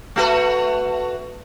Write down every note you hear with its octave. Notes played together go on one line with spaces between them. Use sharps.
A3 F#4 B4